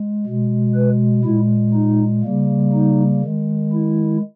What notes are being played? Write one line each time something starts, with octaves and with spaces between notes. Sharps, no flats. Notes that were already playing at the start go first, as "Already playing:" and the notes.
Already playing: G#3
B2 G#3
B4
A#2 G#3 E4
D#4
C#3 G3 A#3
D#4
D#3 G#3
E4